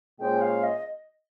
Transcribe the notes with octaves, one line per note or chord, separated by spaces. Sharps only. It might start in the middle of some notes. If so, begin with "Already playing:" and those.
A#2 G#3 C#4 G#4 C5 G5
F5
D#5